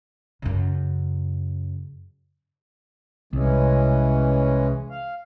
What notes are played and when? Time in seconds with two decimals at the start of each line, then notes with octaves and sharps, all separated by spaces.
0.42 F#2 C#3
3.33 C2 E3 G#3 C#4
4.90 F5